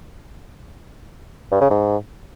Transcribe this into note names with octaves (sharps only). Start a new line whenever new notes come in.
G2
C#3
G#2